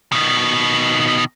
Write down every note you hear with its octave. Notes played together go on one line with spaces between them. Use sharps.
B2 D#3